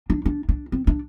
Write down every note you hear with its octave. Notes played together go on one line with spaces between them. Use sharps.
D4
D4
D4
C4
D4